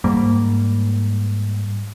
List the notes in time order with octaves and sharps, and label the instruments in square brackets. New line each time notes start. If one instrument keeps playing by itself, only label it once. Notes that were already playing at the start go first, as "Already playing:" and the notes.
[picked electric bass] G#2 G3 A#3